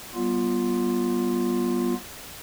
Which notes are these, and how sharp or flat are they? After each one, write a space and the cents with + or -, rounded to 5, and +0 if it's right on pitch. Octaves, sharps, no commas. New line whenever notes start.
G3 -30 B3 -30 F4 +0